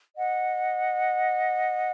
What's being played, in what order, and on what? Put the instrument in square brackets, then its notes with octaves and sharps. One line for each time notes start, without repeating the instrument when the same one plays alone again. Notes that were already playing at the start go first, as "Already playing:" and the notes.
[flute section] D#5 F#5